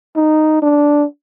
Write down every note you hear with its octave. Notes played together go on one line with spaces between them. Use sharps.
D#4
D4